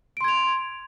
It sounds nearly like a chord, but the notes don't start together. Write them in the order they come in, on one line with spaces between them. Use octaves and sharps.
D7 C6 G#6 F7